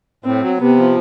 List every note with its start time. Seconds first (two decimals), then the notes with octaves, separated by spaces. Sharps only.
0.24 A2 C4
0.41 F#3
0.60 C3 B3
0.77 F3